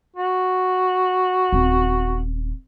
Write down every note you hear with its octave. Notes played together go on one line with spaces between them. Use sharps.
F#4
D#1 C4